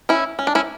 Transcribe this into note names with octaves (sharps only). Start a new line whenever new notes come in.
C#4 E4
C#4
D4
C#4 E4